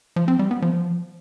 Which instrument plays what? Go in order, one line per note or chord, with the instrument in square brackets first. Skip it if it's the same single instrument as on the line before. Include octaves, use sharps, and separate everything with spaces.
[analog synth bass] F3
C4
G3
B3
F3